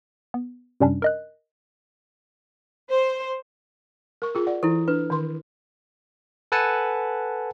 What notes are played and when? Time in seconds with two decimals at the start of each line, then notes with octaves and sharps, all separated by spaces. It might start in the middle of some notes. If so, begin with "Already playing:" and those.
0.34 B3
0.80 F#2 C3 G3 C#4 D4
1.02 A#4 D#5 F#6
2.90 C5
4.22 A#4 C#6
4.35 F4 G#4
4.47 D5 F#5
4.63 E3 E4 A4
4.88 D4 B4
5.10 D#3 C6
6.52 A4 B4 F#5 G#5 A5